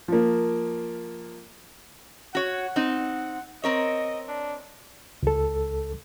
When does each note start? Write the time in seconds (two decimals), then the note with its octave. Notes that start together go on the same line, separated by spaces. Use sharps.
0.08 F3 A#3
2.35 F#4 C#5 F#5
2.76 C4 D#4
3.64 C4 A#4 C#5 D#5
4.28 D4
5.23 C#2 A4